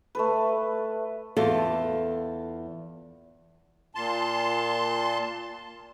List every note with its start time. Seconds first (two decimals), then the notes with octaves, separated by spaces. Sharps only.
0.15 A3 A4 B4
1.37 E2 F4 A4
3.95 A#2 A5 C6